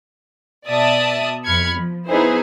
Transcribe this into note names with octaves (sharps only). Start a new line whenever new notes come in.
B2 D5 E5 A5 D#6
F2 B5 F6 G#6 C#7
F3
B3 D#4 E4 G#4 B4 C5